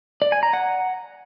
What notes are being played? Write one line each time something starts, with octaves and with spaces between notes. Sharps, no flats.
D5
G#5
A#5
F#5